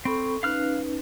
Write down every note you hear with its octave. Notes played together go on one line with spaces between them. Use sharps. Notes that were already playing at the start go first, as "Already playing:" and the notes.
C4 A4 B5 C#6
C#4 D#4 B4 F5 F6 F#6